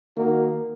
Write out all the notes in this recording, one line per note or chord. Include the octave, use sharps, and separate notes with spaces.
D#3 A#3 D#4 F#4 A#4